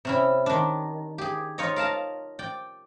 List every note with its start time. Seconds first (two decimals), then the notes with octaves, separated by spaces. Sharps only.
0.05 C3 C#4 E4
0.46 D#3 D4
1.18 G4 G#4
1.58 D#4 F4 C#5 D#5
1.76 A#4 F5 A5 A#5
2.39 D5 G5